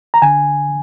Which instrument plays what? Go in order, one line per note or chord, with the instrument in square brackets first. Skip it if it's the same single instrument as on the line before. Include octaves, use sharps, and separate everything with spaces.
[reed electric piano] A#5
D3 G#5